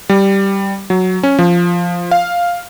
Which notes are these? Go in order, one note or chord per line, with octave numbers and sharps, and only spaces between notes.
G3
F#3
C#4
F3
F5